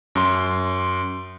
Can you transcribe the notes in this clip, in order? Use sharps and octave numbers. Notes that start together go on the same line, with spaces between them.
F#2 C6